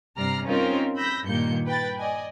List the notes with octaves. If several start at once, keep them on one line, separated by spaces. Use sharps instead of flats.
G2 C3 D5 A#5 F6 C7
C4 C#4 D#4 F4 A#4 C5
B5 E6 G6 A#6 B6
G2 A#2 D#3 A#3 G6 C#7
B4 G5 A6
D5 D#5 G#5